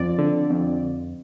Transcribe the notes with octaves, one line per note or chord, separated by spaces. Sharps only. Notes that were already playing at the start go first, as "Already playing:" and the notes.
Already playing: F2 D5
D3
F2